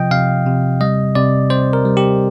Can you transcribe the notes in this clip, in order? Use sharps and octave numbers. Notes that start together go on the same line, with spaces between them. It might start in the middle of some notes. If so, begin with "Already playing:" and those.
Already playing: C3 F3 D#5 G5
C3 F5
C3
G3 D#5
C3 D5
C4 C5
A#4
G3
G4